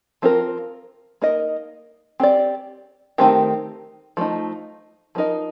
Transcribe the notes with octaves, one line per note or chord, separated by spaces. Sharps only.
F3 C4 F4 A#4
A#3 D#4 A#4 D#5
C4 G4 D5
D#3 A3 C4 G4 A#4
F3 A3 D#4
F3 A#3 D#4 A#4 D#5